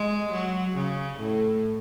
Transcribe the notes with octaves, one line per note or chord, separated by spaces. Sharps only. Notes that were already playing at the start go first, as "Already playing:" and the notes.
Already playing: G#3
F#3
C#3
A2